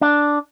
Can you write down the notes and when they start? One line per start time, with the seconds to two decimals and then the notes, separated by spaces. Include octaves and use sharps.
0.01 D4